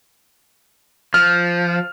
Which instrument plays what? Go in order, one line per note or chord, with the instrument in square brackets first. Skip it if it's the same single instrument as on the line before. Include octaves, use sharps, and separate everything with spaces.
[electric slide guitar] F3 [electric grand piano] F6